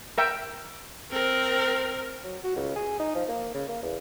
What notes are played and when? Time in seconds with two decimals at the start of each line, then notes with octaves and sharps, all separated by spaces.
0.18 A#4 E5 G5
1.11 C4 A#4
2.24 F#3
2.44 F#4
2.56 C#2
2.76 G#4
2.99 D#4
3.15 F3
3.28 A#3
3.54 C#3
3.68 A#3
3.83 E2